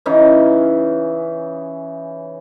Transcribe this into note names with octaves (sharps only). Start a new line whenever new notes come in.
C#3 E3 C#4 D#4